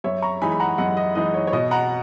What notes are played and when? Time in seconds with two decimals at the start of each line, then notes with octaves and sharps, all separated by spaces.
0.04 F#2 C#5 E5
0.22 A#5 C#6
0.42 E3 G#3 D#4 G#5 B5
0.52 B5
0.60 F#5 A#5
0.78 F#2 D#5 F#5
0.97 D#5
1.15 E3 G#3 D#4 D#5
1.34 C#5
1.47 C#5
1.52 B2 D#5
1.71 F#5 A#5